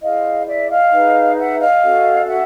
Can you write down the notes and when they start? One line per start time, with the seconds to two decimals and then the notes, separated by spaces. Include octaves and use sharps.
0.02 E4 G#4 C5 D#5 F5
0.47 D5 E5
0.69 D#5 F5
0.92 D#4 G#4 B4
1.37 E5 F#5
1.60 D#5 F5
1.82 C#4 F#4 A4
2.28 E5 F#5